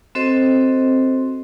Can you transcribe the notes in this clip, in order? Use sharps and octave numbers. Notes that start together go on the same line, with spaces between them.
C4 F#4 A4 C5 D#5